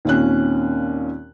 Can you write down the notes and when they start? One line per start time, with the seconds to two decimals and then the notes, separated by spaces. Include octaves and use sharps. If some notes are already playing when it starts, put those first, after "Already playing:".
0.05 D#2 A#2 C4 C#4 F#6